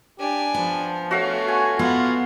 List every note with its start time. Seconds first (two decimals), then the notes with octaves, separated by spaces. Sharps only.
0.19 D4 G4 G#5
0.54 F3 B3
1.11 A3 F#4 C#5 F5
1.48 F#4 G#5
1.79 B3 F4 F#4 F5